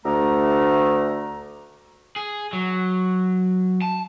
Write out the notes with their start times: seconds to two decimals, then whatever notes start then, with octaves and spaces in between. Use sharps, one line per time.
0.05 D2 A3 A#5
2.16 G#4
2.53 F#3
3.82 A5